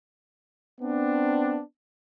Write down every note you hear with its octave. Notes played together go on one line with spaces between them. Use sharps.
B3 C4 D4